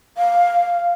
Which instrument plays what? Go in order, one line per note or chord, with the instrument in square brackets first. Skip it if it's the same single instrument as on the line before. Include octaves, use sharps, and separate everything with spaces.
[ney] F5